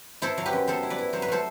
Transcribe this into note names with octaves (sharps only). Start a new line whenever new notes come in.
E4 A4 C5
F#3
G4 B4
F#2
B3 A4 C5
E4
B4 D5
E4
F#3 C5
B4
A3 A4 C5